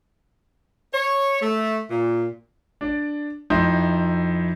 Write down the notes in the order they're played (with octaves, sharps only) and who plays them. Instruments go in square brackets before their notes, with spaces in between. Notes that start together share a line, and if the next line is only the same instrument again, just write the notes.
[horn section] C#5
A3
A#2
[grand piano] D4 D5
F2 D#4 E4 E5 C6 G6